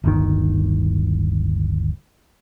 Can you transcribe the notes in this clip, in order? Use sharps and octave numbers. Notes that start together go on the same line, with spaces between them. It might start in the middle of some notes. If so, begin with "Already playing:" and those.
D1 G1 D#3